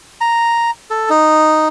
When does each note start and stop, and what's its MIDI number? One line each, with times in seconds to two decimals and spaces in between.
0.21 0.71 82
0.90 1.09 69
1.10 1.68 63